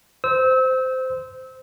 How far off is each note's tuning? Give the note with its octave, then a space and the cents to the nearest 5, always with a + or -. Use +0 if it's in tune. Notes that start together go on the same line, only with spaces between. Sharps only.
C5 -15 E6 -30